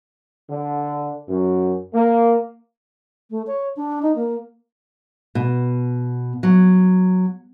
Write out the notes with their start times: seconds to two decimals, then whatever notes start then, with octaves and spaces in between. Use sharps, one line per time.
0.50 D3
1.28 F#2
1.94 A#3
3.30 A3
3.47 C#5
3.76 D4
4.02 D#4
4.16 A#3
5.35 B2
6.43 F#3